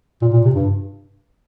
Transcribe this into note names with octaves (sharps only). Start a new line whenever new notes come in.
A#2
A#2
C3
G2